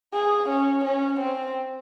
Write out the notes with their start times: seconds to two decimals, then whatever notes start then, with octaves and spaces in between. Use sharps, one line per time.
0.13 G#4
0.48 C#4
0.84 C#4
1.19 C4